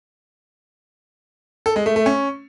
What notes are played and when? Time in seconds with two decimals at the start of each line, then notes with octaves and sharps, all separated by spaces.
1.66 A4
1.76 G#3
1.86 A3
1.96 A3
2.06 C#4